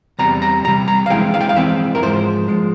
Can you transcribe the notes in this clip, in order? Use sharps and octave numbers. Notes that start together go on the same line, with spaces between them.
E2 C3 G3 A#5
A#5
E2 C3 G3 A#5
A#5
F5
F2 E3 G#3 E4 G5
F5
G5
F5
F2 E3 G#3 C4 E4 E5
A#4
G#2 F3 G#3 C5
F3 G#3